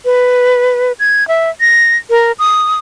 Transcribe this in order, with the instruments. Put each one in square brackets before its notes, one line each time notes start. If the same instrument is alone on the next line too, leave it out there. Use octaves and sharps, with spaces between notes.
[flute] B4
G#6
E5
A#6
A#4
D#6